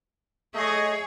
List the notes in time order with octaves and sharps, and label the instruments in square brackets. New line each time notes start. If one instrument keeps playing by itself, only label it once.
[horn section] A3 D#5 [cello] G#4 C#5